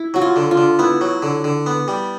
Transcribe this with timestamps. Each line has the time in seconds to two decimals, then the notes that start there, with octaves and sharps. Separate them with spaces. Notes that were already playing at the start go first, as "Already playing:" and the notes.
Already playing: E4
0.14 F#3 F#4
0.22 F4
0.36 D3
0.51 F4
0.57 D3
0.79 B3 E4
1.01 F#3
1.22 D3
1.44 D3
1.66 B3
1.88 G3